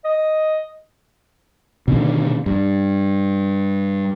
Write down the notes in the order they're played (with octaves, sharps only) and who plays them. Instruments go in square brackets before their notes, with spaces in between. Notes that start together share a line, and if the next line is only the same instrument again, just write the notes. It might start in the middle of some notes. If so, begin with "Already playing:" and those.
[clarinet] D#5
[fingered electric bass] B2 D3 D#3
G2